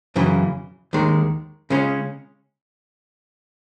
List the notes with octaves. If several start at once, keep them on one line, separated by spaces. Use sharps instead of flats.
F#2 C#3 E3
D#2 D#3 G#3
C#3 G#3 C#4